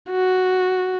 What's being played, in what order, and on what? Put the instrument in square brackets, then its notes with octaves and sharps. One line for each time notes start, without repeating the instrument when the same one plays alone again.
[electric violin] F#4